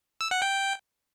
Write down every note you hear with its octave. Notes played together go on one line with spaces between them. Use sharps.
E6
F#5
G5